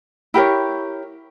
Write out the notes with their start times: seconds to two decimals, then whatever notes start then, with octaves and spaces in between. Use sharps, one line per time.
0.34 E4 G4 A#4 C#5